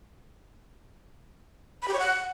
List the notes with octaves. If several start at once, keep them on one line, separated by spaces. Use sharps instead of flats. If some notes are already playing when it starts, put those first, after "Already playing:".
B5
G4
C#5
F#5